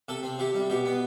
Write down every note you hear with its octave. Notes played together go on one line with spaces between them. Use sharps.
C3 A4
C4
C3 G4
G3
B2 G4
B3